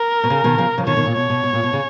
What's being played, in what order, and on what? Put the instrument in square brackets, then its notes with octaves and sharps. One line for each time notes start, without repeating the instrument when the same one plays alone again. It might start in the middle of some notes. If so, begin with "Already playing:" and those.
Already playing: [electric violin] A#4
[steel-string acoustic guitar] B2
C#3
B2 D#3
C#3 F3
C#3 F3
[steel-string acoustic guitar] B2 D#3 [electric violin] C#5
[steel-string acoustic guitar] B2 D#3
A#2
[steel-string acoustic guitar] B2 [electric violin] C#5
[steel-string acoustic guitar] B2
B2
A#2
B2
C#3